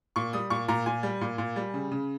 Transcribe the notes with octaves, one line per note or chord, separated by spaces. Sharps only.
A#2 C#6
G3 D#6
A#2 C#6
A#2 A#5
A#2 G#5
G3
A#2
A#2
G3
C#3
C#3